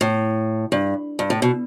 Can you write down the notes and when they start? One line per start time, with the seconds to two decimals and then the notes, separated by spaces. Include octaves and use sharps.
0.01 A2
0.72 G2
1.19 G2
1.30 A2
1.42 B2